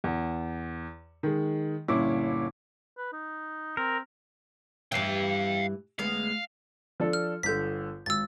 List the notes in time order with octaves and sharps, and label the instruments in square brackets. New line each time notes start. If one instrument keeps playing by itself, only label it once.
[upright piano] E2
D#3 G#3
G1 A#2 C#4 E4 D6
[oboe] B4
D#4
[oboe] C4 [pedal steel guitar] A#4
[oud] G2 E3 [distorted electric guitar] F5 G5
[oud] D2 G#3 B3 [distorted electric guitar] F5
[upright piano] F3 D4 A4
[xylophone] F6
[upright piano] G1 D3 [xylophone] G6 B6
[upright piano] G#1 [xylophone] E6 A6